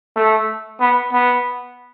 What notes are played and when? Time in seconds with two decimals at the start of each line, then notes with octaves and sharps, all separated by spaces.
0.16 A3
0.80 B3
1.12 B3